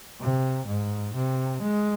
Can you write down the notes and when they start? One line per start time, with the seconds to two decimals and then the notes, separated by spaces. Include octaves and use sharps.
0.21 C3
0.67 G#2
1.15 C3
1.62 G#3